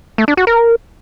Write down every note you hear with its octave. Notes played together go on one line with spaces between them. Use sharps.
A3
D4
F#4
A#4